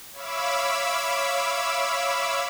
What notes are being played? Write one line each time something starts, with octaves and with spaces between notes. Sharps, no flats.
C#5 E5 F5 B5 D6 E6